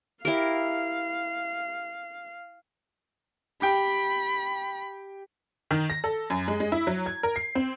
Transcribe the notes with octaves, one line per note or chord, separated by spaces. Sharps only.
E4 G4 A#4 F5
G4 G5 B5
D#3
A#6
A4
F#2
G#3
G#3
E4
F#3
G#6
A#4
C7
C4